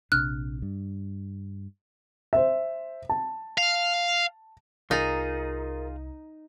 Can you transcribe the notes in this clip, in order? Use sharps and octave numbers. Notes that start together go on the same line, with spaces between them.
A#1 C3 D4 F6 F#6
G2
C5 E5
A5
F5
C2 D#4 F4 G#4 A#4 A6